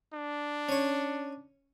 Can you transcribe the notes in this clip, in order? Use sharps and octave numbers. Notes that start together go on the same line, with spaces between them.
D4
C#4 C#5